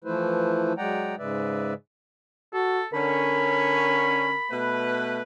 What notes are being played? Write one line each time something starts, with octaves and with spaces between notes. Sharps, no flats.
E3 F3 A3 E4 B4 C5
F#3 G#3 D5 F#5 G5 A#5
G#2 C#3 G#3 B4 D5 E5
F#4 A4
D3 C#4 A#4 B5
B2 A3 B4